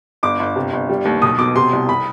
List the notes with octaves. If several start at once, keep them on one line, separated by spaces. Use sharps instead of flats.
G1 D6
G1
C3
G1
G3
D#2
B1 D#6
B2 D6
C3 C6
C2
B5